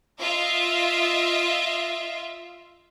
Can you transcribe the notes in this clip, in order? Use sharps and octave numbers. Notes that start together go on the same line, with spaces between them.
F4 D#5 E5